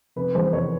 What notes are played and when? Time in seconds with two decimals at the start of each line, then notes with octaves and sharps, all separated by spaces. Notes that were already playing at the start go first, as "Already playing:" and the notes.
0.16 F1 B4
0.35 E2 C5
0.53 F1 C#5